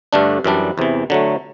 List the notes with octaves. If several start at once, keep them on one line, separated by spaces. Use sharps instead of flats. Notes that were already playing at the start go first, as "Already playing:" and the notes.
G2 D3 A3 D4
F#2 E3 G3 D4
E2 C3 E3
D3 F#3 A3